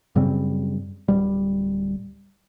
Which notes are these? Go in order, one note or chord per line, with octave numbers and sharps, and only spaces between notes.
F#2 C#3 G3 C4
D1 G3